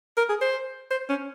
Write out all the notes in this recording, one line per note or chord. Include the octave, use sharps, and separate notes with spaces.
A#4
G#4
C5
C5
C#4